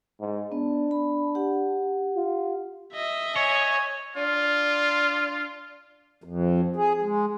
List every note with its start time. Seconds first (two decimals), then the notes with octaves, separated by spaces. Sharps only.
0.20 G#2
0.52 B3 D4
0.91 B5
1.35 G4 F#5
2.16 F4
2.93 D#5 E5
3.36 C#5 G#5
4.16 D4 F4
6.24 F2
6.76 G#4
7.02 G#3